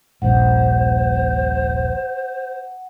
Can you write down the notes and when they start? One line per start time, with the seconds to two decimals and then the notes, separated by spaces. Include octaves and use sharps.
0.22 D#1 A#1 G2 C5 F#5